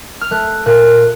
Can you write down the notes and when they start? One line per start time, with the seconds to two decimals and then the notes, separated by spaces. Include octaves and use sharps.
0.21 F6
0.31 A3 F#6
0.66 A#2 F#6